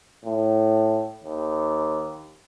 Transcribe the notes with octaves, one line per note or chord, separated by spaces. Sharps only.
A2
D#2